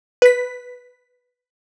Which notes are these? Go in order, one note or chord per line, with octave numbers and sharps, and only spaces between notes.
B4 B6